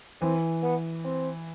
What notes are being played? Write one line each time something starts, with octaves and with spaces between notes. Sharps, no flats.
E3 C4
B3
C4